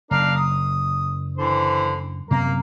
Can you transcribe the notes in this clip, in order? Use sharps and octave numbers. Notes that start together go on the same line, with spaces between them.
F#1 D4 A#4 F5
D#6
D3 E3 C5
F#2 C3 A#3 B3 A#4